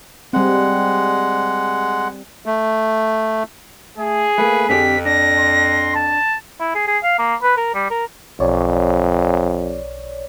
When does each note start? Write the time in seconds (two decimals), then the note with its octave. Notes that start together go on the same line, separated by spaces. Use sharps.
0.33 G3 G#3 C4 F#5
2.46 A3
3.98 A3 G#4
4.38 A3 A#3 B4
4.69 F2 D3 C4 G4 B6
5.05 D4 A#6
5.40 C6
5.95 A5
6.60 E4
6.75 G#4
6.88 G#4
7.04 F5
7.19 A#3
7.43 B4
7.57 A#4
7.75 G3
7.91 A#4
8.40 B1 F2 C#5 D5